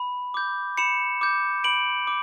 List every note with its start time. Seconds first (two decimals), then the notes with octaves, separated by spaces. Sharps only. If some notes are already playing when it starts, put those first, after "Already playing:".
Already playing: B5
0.34 D6 G6
0.77 B5 C#7 E7
1.21 D6 G6
1.64 B5 D7 F#7
2.07 D6